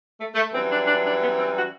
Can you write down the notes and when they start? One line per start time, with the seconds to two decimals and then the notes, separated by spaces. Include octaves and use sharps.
0.18 A3
0.35 A3
0.52 F#2 E3 G3 C4
0.69 D4
0.86 D4
1.04 D4
1.21 B3
1.38 C4
1.55 F#4